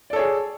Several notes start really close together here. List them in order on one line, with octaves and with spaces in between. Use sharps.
D5 A4 C#5 G#4